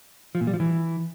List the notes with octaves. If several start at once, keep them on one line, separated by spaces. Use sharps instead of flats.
F3
A#2
G3
F3
E3